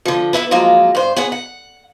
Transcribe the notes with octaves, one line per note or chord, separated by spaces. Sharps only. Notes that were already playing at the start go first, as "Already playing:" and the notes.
D3 F3
B3 E4 D#5 E5
F3 F#3 G#3 A#3 F4
G2 C5
B3 G#4 C#5 F#5
F#5